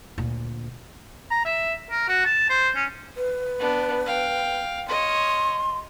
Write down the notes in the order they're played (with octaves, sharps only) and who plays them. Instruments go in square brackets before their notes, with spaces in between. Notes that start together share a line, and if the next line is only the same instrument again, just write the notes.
[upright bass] D2 A#2
[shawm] A#5
E5
A#4
F#4
A5
C5
C#4
[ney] B4
[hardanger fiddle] B3 D4
F5 G5
[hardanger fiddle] C#5 D#5 [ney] C6